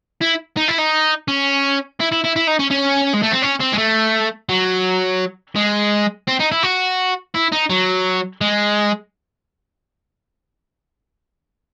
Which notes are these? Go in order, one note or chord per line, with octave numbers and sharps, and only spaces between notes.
E4
D#4
E4
D#4
C#4
E4
E4
E4
E4
D#4
C#4
C#4
G#3
A3
C4
C#4
C4
G#3
A3
F#3
G#3
C4
D#4
E4
F#4
E4
D#4
F#3
G#3